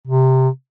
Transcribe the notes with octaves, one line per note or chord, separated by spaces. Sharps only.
C3